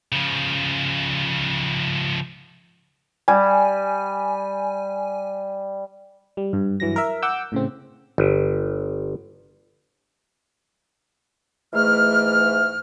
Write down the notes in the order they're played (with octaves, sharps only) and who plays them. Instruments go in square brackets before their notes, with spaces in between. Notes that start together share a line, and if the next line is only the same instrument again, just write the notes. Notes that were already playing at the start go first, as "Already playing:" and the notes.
[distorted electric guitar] C#3 F3
[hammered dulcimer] G3 [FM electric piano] G#5
[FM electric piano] G3
G2
G2 E3 F#3 A#6
A#4 E5
F#5 D6 E6 G6
A2 C#3 C4
[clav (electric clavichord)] G1
[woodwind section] G#2 E3 A3 F6